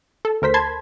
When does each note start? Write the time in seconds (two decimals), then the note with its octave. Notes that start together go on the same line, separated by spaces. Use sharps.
0.25 A4
0.42 D2 A#4 C5 B6
0.54 A5 B5 C6 G#6